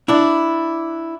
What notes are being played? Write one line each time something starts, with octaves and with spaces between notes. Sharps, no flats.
D4 E4